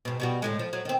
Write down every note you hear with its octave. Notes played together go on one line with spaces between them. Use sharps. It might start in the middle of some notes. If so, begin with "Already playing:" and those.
G#2 B2
B2 G3 F#4
D2 A2 G#3
F3
F#3
D#3 C4